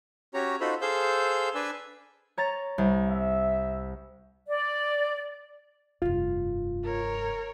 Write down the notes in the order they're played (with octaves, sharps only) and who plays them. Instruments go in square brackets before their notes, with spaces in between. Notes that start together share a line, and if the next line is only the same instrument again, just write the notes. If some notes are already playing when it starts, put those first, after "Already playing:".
[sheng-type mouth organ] C#4 F#4 G4 C#5 A#5
D#4 F4 F#4 A4 C5 B5
G#4 A4 C5 F5 E6 G6
D4 B4 D5 G#5 E6
[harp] C#5 A#5 A6
C2
[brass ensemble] E5
[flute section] D5
[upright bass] F1 G2 [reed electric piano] F4
[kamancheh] A#4 C#5